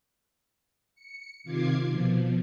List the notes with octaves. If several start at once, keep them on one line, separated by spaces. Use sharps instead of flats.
C#7
C3 D#3 F4 D6 G#6 C7
B2 F3